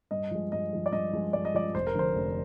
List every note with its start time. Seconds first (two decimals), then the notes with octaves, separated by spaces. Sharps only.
0.11 G2 D#5
0.31 F3 G#3
0.52 G2 D#5
0.73 F3 G#3
0.86 D5
0.93 G2 D#5
1.13 F3 G#3
1.33 G2 D5
1.45 D#5
1.54 F3 G#3 D5
1.75 F1 C5
1.87 A#4
1.95 F2 D3 C5
2.15 F1